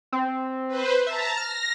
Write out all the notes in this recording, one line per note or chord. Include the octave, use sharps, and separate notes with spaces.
C4
B4 C5
E5 A5 A#5
F6 A#6